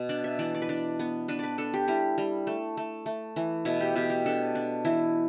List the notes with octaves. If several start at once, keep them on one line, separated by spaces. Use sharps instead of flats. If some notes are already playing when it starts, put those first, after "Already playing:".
Already playing: B2
D4 D5
E5
E3 D5
D5
B4
D4 D5
B3
D4 B4
B4 D5
D4 A4
G4
G3 E4
G3
A3
A3
A3
E3
B2 E4
G4
B2 G4
G4
D4 A4
D4
E3 E4